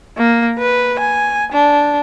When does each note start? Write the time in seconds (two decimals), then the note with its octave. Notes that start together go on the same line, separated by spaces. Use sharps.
0.18 A#3
0.59 B4
0.99 G#5
1.52 D4